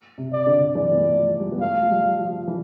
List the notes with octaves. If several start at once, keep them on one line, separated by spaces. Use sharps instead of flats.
C3
D5
D3
E3 D5
B3
A3
F3
G3
B3
A3 F5
F3
G3
F3
E3